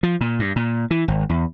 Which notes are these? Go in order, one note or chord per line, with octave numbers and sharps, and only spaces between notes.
F3
A#2
G2
A#2
E3
G#1
E2